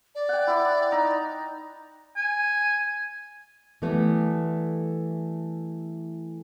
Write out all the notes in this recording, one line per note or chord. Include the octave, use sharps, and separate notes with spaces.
D5
F#5 G5
E4 D6
D#4 A#5
G#5
E3 G3 A3 B3